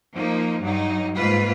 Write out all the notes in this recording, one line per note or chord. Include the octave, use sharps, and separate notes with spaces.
F3 A#3 D#4
G2 F#3 D#4
G#2 A#3 F4 B4